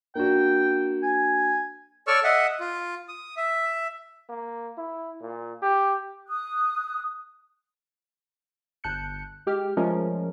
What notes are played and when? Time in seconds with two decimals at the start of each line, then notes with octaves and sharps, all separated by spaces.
0.15 A#3 D4 F#4 G5
1.03 G#5
2.07 A4 C#5 D5 C#6 E6 F6
2.24 D#5 E5 F#5
2.60 F4
3.08 D#6
3.37 E5
4.29 A#3
4.78 E4
5.21 A#2
5.62 G4
6.27 D#6 F#6
8.84 G1 A5 F#6 G6 C#7
9.47 G#3 G4 G5 F6
9.77 F3 G#3 A3 C#4 F4 A#4